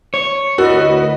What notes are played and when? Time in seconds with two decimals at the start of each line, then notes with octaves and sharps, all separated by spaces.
0.14 C#5
0.58 D2 E4 F#4 A#4 B4 D#5